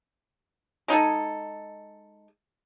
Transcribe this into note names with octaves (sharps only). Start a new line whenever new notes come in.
G#3 D#4 G#4 A4